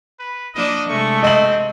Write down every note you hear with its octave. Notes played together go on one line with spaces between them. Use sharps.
B4
F3 A#3 D4 D#5
C3 G#3 A3 C#6
C4 D#5 F#7